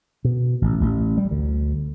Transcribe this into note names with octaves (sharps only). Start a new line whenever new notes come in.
B2
A1
A1
G3
D2